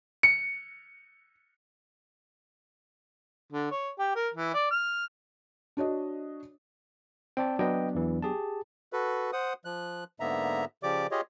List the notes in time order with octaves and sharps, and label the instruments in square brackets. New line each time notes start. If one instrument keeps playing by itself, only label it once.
[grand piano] C#7
[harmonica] D3
C#5
G4
A#4
E3
D5
F6
[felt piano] D4 F#4 C#5 D#5
[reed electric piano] C4 D5 A5 [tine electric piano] G5
[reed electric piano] F#3 B3 D4 [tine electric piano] B4 D#5 G5
[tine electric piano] E2 E3
G4 G#4 A5
[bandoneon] F#4 A4 B4
C5 F#5 D#6
F3 F#6
G#2 D3 A#3 B3 E5 A#5
C#3 F3 G4 D5 D6
F4 G4 G#4 C#5 D#5